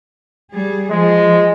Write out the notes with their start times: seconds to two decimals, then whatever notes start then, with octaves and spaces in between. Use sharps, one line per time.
0.52 G3 G#4
0.91 F3 G#3